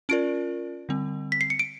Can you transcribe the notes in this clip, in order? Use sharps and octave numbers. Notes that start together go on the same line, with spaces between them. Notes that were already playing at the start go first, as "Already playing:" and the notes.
C#4 F4 A#4 D5 D7
D3 G3 C4
B6
C7
C#7
D7